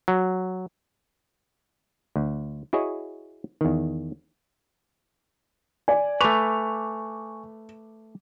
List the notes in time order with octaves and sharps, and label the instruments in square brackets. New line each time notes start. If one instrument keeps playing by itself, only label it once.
[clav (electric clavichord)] F#3
D2
E4 F#4 G#4 C#5 D#5
E2 D#3
[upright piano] D5 G#5
[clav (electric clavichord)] A3 B4 [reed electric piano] G#5 C#6 [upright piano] D6 F7